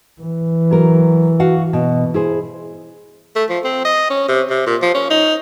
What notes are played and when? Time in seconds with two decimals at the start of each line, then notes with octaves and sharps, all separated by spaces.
0.22 E3
0.71 F#3 A#4
1.40 F#4 F5 F#5
1.73 B2
2.14 E4 G#4 C5
3.36 A3
3.49 F3
3.65 C4
3.85 D#5
4.10 C#4
4.28 C3
4.50 C3
4.67 A#2
4.82 F3
4.95 C#4
5.10 D#4